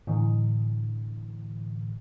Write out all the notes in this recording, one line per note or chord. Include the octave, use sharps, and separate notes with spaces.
A2 D3 E3